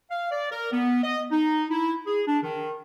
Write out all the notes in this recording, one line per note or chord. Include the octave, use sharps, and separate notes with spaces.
F5
D5
A#4
B3
D#5
D#4
E4
G#4
D4
D#3